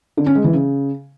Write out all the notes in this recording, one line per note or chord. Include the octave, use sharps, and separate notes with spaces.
D3
C#4
G#3
E3
C#3